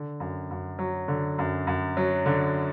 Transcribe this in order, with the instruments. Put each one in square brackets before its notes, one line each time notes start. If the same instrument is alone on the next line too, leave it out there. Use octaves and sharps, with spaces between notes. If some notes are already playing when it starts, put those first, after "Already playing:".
Already playing: [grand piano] D3
F#2
F#2
F#3
D3
F#2
F#2
F#3
D3